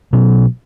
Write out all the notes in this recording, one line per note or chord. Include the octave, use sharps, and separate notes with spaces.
B2 F#3 C#4